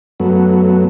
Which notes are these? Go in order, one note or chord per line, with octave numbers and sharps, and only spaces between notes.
F#2 F#3 A3 B3